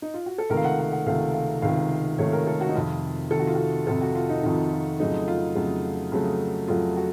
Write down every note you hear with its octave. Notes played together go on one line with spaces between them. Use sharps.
D#4
F4
F#4
A4
C#2 C3 D#3 A3 A#4
F5
F#5
F#5
F#5
C#2 C3 D#3 A3 F5
F5
C#2 C3 D#3 A3 F5
C#2 C3 D#3 A3 C#5
A#4
A4
F#4
D#4
F2 C3 D#3 F4
F2 C3 D#3 A4
F#4
F4
F#4
F2 C3 D#3 A4
F#4
F4
D#4
F2 C3 D#3 D#4
F4
F2 C#3 F#3 A3 D#4
F4
F2 C#3 F#3 A3
F2 C#3 F#3 A3
F2 C#3 F#3 A3 F4
F#4